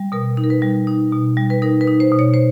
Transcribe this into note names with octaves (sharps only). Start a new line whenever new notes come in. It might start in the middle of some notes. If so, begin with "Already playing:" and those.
Already playing: G3
B2 A#4
D#4
A#4
B4
G3
D#4
B2
G3
B4
D#4 A#4
B4
D#4
C5
B2
C#5
C5